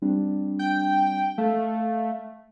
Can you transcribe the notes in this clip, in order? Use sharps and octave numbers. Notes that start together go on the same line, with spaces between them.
G3 C4 D4
G5
A3 F5